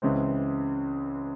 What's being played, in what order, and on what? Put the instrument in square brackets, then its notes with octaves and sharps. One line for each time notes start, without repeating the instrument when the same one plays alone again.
[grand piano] C#2 C#3 E3 G#3 C4